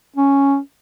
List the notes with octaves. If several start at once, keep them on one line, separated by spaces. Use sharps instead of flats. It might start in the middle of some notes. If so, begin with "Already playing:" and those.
C#4